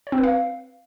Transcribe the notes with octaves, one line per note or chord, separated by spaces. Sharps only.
C#5
C4
B4
F5